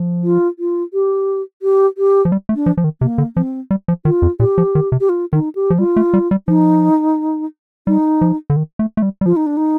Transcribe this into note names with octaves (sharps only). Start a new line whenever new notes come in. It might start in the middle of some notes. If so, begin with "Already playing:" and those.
Already playing: F3
F4
F4
G4
G4
G4
F3
G3
A3
D4
F3
F3
D#3
C3 A#3
D3
F3 C4
G3
F3
D#3 F4
F2
A#2 G4
F3
D#3
C3
G4
F4
D#3 D#4
G4
F3
G3 F4
A3
G3
G3
F3 D#4
G3 D#4
F3
D3
D#3
A3
A3
G3
G3
F3 F4
D#4
D4
D#4